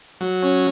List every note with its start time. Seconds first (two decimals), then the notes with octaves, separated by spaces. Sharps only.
0.21 F#3
0.43 C#4